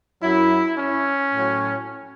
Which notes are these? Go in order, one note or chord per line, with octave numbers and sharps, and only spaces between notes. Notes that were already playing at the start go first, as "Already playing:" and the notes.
F#2 F#3 E4
C#4
A2 F#3